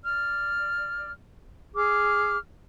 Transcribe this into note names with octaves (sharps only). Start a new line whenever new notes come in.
D5 F6
G#4 D6 F6